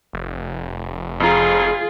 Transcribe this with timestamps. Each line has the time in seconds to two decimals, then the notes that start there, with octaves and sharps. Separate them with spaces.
0.13 F1
1.20 F2 F4 G#4 A#5